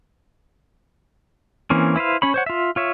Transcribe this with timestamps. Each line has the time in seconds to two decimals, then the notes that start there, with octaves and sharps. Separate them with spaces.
1.70 E3 A#3 C4 C#4
1.96 E4 B4 C5 F5
2.22 C#4 C#5 B5
2.34 C5 C#5 F#5
2.46 F4 E5
2.76 F4 C#5 E5